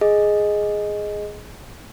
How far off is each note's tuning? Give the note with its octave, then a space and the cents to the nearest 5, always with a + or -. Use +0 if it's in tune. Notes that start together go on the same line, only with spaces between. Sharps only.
G#4 +5 D#5 +0